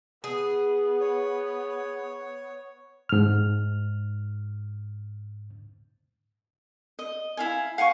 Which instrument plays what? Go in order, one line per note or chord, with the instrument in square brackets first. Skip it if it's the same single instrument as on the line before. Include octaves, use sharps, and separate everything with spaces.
[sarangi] B3 [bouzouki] G#4
[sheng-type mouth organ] C#5
[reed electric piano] G#2 F6
[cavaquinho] D#5
E4 F5 G#5
F5 F#5 G#5 C#6